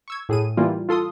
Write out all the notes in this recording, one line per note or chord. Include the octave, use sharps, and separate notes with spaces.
C#6 E6 G#6
A2 G#4 D#7
E3 G3 A#3 E4 F4
F4 A4 C6 D#6